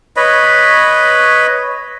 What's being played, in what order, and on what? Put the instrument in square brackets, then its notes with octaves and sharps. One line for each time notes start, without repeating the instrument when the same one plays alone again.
[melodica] B4 C#5 D#5 B5